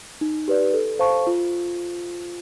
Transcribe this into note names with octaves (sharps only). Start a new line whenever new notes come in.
D#4
G4 B4 D5
A4
C5 F5 A5 C#6
F4